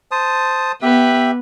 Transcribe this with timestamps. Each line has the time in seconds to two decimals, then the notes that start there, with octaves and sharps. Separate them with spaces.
0.11 C5 A5 D#6
0.82 B3 G4 B4 E5